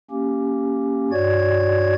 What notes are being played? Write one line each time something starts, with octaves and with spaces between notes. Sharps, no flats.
A#3 C#4 G4
G2 F#4 C#5 D5 G#6